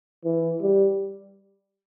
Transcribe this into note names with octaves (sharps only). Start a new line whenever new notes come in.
E3
G3